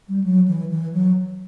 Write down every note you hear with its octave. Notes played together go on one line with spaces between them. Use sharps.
G3
F#3
E3
E3
F#3